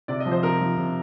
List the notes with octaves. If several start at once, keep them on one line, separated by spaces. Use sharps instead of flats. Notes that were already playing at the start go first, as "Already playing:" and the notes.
C3 D5
D#5
F3
C5
C3 A#4
F3
C3